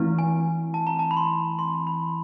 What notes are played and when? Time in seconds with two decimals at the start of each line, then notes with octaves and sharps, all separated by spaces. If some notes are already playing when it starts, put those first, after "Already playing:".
Already playing: E3 A3 C4 E4
0.19 G#5
0.74 A5
0.87 A#5
0.99 A5
1.11 B5
1.17 C6
1.59 C6
1.87 B5